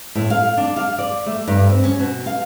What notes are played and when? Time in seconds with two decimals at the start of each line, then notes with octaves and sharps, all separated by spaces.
0.15 A2
0.30 F5
0.58 D4
0.76 F5
0.98 D5
1.26 A3
1.47 G2
1.69 C4
1.84 C#4
1.99 B2
2.26 F5